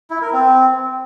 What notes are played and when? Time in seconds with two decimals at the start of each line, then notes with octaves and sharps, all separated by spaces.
0.10 E4
0.22 A#4
0.33 C4